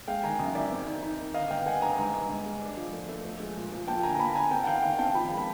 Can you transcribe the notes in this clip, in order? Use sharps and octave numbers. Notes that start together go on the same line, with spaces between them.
G#3 F5 G5
D#3 G#5 A#5
F#2
D#3 D5 E5
C4
D#4
D#4
D#3
D3 D#5 F5
G2 F5 G5
G2 F#5 G#5
G2 G#5 A#5
G#2
G#2
G#2
G#3
D4
F3
A3
A3
F3
G#3
A#2
F3
A#3 G5 A5
D3 G#5 A#5
A#5
A#3 A5 B5
A#3 G#5 A#5
C4 G5 A5
F#5
D#3 F5 G5
D#3 F5 G5
C4 G5 A5
F3 B5
G#3
A5 B5